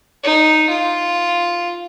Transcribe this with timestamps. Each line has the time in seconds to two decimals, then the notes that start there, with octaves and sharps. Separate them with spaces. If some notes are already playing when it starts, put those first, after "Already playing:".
0.24 D#4
0.70 F4